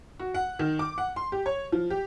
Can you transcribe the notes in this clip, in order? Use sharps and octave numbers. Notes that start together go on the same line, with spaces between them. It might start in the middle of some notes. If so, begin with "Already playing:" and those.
F#4
F#5
D#3
D6
F#5
C6
G4
C#5
F3
G4